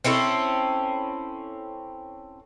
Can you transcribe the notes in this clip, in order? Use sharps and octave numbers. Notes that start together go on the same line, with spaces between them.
C4 C#4 E4 A4